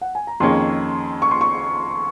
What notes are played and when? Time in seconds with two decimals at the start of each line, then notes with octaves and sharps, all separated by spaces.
0.01 F#5
0.15 G#5
0.27 A#5
0.40 F2 D#3 A#3 C#4 G#4 C6
1.22 C#6
1.31 C6
1.41 C#6